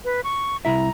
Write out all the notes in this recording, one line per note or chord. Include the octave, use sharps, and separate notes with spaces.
B4
C#6
C2 E4 E5 A#5